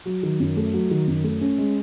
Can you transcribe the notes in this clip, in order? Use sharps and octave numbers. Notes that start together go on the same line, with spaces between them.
F#3
D#3
F#2
A3
F#3
D#3
F#2
A3
C#4
G#3